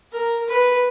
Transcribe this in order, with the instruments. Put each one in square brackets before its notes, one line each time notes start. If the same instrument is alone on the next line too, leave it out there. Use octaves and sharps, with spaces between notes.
[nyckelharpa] A#4
B4